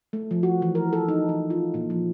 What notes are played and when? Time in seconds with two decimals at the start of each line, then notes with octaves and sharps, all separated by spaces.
0.13 A3
0.31 F3
0.43 F#4
0.62 E3
0.75 A#4
0.93 A4
1.08 D#4
1.29 E3
1.50 F4
1.74 A#2
1.90 F3